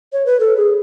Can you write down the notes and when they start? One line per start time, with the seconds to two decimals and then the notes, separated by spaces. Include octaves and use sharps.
0.13 C#5
0.26 B4
0.40 A4
0.57 G#4